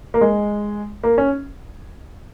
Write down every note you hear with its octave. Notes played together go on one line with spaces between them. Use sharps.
A#3
G#3
A#3
C#4